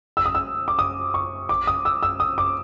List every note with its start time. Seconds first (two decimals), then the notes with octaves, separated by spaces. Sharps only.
0.17 E6
0.26 D#6
0.35 E6
0.68 D6
0.79 D#6
1.14 C#6
1.49 D6
1.67 D#6
1.85 E6
2.03 E6
2.20 D#6
2.38 D6